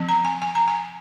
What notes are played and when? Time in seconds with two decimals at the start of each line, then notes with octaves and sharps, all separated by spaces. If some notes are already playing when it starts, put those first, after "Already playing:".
Already playing: F3 C4
0.09 A#5
0.25 G#5
0.42 G#5
0.55 A#5
0.68 G#5